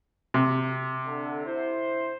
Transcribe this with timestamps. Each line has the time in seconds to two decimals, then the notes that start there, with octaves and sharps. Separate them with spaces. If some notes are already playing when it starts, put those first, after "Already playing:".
0.34 C3
1.06 D3
1.45 E4 C5